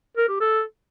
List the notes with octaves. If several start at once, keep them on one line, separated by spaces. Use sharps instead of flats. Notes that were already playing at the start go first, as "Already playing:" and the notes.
A#4
G4
A4